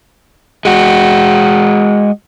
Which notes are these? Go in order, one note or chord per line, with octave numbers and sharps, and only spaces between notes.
G#3 F#4